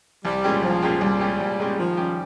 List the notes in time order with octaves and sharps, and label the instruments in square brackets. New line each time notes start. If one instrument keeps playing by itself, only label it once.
[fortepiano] C2 [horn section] G3
[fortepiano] A#2 G#3 C#4 G4
[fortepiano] C2 [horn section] F3
[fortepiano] A#2 G#3 C#4 G4
[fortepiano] C2 [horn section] G3
[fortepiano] A#2 G#3 C#4 G4
C2
A#2 G#3 C#4 G4
[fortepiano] D#3 [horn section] F3
[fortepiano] G3 C#4 G4